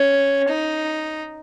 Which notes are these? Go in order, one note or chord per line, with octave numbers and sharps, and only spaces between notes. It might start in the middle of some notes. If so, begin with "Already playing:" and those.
Already playing: C#4
D#4